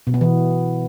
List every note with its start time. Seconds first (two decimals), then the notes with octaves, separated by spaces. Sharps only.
0.07 B2
0.14 B3
0.21 E3